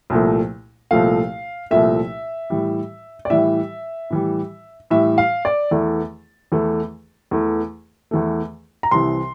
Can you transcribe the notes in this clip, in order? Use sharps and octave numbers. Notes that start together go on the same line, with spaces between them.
C2 A#2 F3 A3
C2 A#2 F3 A3 F5
C2 A#2 F3 A3 E5
A2 E3 G3
D5
A2 E3 G3 E5
A2 E3 G3
A2 E3 G3 E5
F5
D5
E2 E3 A3
E2 E3 A3
E2 E3 A3
E2 E3 A3
A#5
C2 C3 E3 C6